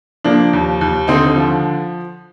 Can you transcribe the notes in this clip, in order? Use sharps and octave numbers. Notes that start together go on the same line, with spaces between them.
F3 A#3 D4
D#2
D#2
D3 C4 D#4
F3